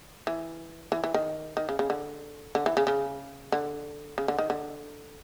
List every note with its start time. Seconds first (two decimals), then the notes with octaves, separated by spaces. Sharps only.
0.27 E3
0.92 E3
1.04 E3
1.14 D#3
1.57 D#3
1.69 C#3
1.79 C#3
1.90 D3
2.55 D3
2.66 E3
2.77 C#3
2.87 C#3
3.52 D3
4.18 C#3
4.28 D3
4.39 D#3
4.50 D3